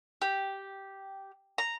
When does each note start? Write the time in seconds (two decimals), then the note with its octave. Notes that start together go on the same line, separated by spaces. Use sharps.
0.22 G4
1.58 A#5